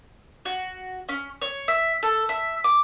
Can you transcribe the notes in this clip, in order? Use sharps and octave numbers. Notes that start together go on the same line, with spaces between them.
F#4
C#4
C#5
E5
A4
E5
D6